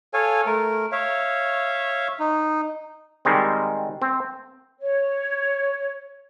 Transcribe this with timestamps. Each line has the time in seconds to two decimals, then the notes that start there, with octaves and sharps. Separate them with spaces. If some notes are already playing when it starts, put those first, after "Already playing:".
0.14 A4 C#5 F5 G#5
0.46 A3 A#4
0.92 C#5 E5 F5
2.20 D#4
3.25 D#3 G3 G#3 C4
4.02 C4
4.81 C#5